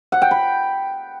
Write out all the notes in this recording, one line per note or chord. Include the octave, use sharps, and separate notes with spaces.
F#5
G5
B5